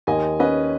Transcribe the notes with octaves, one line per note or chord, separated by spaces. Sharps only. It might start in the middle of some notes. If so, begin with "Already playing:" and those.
D#2 D#5 G#5
C#4 B4 D#5